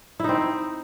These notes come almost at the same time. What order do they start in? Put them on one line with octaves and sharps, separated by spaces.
E4 D#4 C4